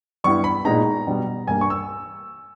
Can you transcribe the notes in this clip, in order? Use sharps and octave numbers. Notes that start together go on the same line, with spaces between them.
G2 G3 B3 E4 C#6
B5
A#2 G#3 B3 D#4 A#5
B2 G3 B3
G2 G3 A#3 G#5
C#6
E6